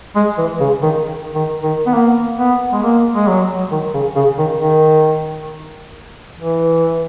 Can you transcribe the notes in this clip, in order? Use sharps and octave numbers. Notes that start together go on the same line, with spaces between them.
G#3
E3
C#3
D#3
D#3
D#3
B3
A#3
B3
G#3
A#3
G#3
F#3
D#3
C#3
C#3
D#3
D#3
E3